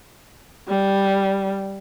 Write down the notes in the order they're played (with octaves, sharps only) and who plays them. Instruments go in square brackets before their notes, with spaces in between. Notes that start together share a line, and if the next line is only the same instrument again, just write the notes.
[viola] G3